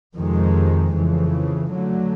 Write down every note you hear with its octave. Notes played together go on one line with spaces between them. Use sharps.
F2 C3 D#3 G#3
F2 C#3 E3
D3 F#3 A3